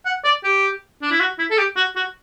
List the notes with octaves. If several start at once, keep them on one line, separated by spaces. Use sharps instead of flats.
F#5
D5
G4
D4
E4
F#4
E4
A4
G4
F#4
F#4